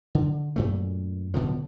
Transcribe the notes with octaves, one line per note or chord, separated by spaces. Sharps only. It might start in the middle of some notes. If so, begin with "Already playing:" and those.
D3
F#2 A#2 A3
D1 B2 D3 F3